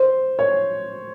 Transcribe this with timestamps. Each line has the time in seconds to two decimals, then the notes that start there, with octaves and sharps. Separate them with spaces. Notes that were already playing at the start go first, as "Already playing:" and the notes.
Already playing: C5
0.39 C#5